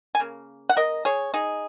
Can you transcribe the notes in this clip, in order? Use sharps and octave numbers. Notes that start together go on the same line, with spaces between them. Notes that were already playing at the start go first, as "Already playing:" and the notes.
G#5
C#3 A#3
F#5
A#4 D#5
G#4 C#5
D#4 G#4